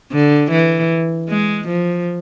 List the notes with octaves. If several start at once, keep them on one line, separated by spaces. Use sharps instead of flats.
D3
E3
G#3
F3